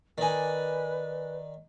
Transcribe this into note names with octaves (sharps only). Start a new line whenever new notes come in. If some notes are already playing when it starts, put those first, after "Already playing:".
D#3 D#4 B4 D5 G#5